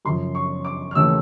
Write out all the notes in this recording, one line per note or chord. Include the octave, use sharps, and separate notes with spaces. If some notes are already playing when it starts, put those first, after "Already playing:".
F#2 C#3 F3 C6
C#6
D6
F6
D#2 C#3 E3 A3 E6